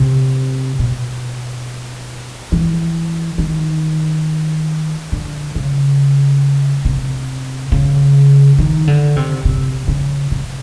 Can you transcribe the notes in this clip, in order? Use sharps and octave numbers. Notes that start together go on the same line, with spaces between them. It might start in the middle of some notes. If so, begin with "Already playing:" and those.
Already playing: C3
B2
E3
D#3
D3
C#3
C3
C#3
D#3
D3
C3
C3
C#3
C3